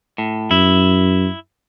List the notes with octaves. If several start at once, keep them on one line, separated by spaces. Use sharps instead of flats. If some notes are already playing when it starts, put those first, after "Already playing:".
A2
F#2 E4